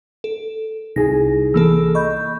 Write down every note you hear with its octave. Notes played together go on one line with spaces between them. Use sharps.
A4
C2 D#4 E4 G#4 A#6
E3 A#3 A4 A5 E6
D#5 B5 C#6 G6